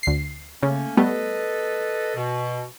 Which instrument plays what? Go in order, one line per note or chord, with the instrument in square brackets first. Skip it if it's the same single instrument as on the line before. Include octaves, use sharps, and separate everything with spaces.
[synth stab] D2 C7
[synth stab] C#3 [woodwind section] A3 A#3 C#4
[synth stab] G3 A3 B3 [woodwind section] A4 B4 D#5
[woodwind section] B2